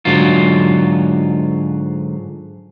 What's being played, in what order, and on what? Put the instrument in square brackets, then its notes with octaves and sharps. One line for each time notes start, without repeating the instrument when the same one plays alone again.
[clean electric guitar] G#2 D3 F#3 F4